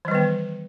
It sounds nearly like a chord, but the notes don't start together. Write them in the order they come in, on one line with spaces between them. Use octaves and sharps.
E3 G3 D#3 B3